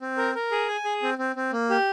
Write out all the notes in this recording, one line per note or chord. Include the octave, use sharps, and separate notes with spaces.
C4
A#4
A#4
G#4
G#5
G#4
C4
C4
C4
A#3
G4